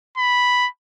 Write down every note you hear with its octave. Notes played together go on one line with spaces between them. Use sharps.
B5